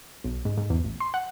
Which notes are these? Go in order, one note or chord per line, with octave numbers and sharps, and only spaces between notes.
B1
G#2
G#2
E2
A1
C6
F#5